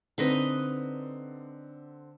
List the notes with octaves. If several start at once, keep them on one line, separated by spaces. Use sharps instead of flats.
D3 C4 D#4 B4 D#5